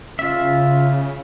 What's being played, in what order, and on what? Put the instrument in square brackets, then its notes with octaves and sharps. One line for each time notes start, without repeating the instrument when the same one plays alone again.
[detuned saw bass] C#3 [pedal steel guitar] F4 E5